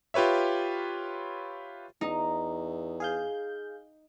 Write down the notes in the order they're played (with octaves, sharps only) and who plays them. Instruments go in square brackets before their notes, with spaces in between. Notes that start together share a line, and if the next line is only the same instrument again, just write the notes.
[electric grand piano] F4 G4 B4 C#5 E5
[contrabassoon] E2 [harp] D#4
[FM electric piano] G#4 F5 G6